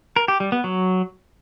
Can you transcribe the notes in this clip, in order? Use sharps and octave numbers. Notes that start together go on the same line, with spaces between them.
A#4
G4
G3
B3
F#3